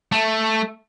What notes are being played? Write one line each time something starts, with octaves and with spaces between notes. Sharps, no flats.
A3